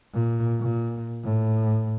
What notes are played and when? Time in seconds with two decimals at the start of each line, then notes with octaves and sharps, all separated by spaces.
0.14 A#2
0.60 A#2
1.24 A2